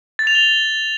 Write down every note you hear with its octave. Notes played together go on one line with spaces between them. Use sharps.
A6
F7
G7